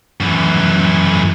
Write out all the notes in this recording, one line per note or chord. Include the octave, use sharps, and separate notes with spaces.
F#2 E3